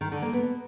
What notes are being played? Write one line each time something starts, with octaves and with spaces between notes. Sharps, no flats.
D#3
D3
A#3
B3